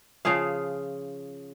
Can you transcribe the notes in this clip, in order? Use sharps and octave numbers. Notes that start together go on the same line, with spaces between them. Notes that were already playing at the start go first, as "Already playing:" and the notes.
C#3 F3 G#4 F5